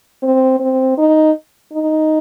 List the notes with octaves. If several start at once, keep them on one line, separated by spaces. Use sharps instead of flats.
C4
C4
D#4
D#4